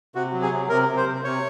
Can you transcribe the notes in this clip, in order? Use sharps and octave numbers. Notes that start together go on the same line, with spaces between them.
C3 F#4
F#3
G#4
C3
C3 A#4
C3
C5
C3
C3 C#5